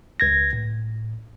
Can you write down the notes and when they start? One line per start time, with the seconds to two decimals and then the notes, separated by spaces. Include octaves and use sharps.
0.20 C#2 G#6 A#6
0.53 A2